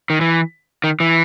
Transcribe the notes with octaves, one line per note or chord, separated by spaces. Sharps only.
D#3
E3
D#3
E3